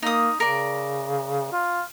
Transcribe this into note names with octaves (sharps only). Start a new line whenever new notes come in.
A#3 D#4 D#6
C#3 A#4 D5
F4